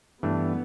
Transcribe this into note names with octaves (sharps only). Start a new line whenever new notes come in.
G2 E3 A3 B3 D4